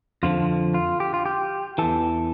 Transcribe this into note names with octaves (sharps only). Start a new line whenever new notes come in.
F2 D3 F3 F4
F4
G4
F4
G4
E2 E3 A4